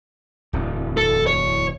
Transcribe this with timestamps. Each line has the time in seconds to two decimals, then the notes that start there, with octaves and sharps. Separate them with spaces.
0.53 D1 E2
0.97 A4
1.27 C#5